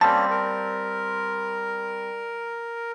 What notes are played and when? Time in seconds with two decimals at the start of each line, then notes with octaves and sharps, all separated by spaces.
0.01 G3 A#3 C4 C#4 A5
0.30 A#4